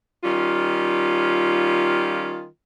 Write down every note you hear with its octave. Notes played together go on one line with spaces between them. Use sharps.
D#3 G3 C#4 F4